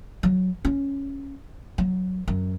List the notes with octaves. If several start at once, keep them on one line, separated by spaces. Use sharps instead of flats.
F#3
C#4
F#3
F#2